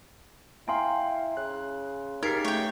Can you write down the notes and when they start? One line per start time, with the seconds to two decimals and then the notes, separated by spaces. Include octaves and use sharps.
0.68 E4 F5 G5 G#5 A#5 C6
1.37 C#3 F#6
2.23 C#3 D#4 G4 A#4 G#6 B6 C7
2.45 A3 C#5 G5